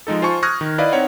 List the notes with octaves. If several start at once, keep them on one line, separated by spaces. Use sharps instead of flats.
F3 G#3 D#4 A4
F4 C5 G#5 A5 C#6
C#6 D#6 F6 F#6 G#6 A#6
D#3
E4 B4 D5 D#5 F5
C4 D#4 C#5 F#5